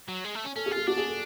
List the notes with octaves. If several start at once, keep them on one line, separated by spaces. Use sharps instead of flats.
F#3
G#3
A3
C#4
C#4 A4
G#4
F4
G#4
D4 F#4
G#4
A4